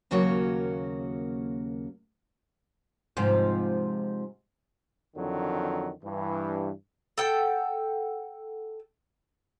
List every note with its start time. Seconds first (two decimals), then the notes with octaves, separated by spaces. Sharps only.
0.11 D#2 C#3 F#3 A#3 F#4 C#5
3.17 G#2 C3 F3
5.16 F2 D3 D#3 F#3
6.04 G2 E3
7.18 A4 F#5 G5